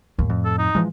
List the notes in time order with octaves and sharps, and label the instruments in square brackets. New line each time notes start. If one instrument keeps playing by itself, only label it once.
[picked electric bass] D#2 [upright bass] A2
[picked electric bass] F2
[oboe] A4
D#4
[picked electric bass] E3 F3 G#3